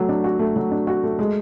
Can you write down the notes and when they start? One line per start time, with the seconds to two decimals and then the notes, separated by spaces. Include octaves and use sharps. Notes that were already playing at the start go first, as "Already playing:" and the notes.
Already playing: F#3 A3 F#4
0.09 D4
0.24 F#4
0.39 A3
0.56 F#3
0.71 D4
0.87 F#4
1.04 A3
1.19 G#3